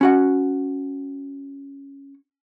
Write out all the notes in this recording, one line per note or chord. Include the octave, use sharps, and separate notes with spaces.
C#4 F#4 F#5